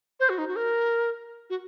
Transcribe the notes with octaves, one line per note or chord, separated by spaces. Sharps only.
C5
F#4
D#4
F#4
A#4
F#4